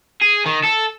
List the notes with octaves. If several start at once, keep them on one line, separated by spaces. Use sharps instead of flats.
G#4
D#3
A4